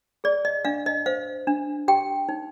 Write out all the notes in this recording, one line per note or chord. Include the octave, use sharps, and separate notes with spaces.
G#4 D5
D#5
D4 F5
D#5
C5 F5
D4
G4 G5
D#4